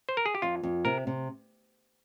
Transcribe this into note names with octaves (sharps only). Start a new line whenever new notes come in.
C5
A#4
G#4
G4
F2 F4
F2
C3 A#4
C3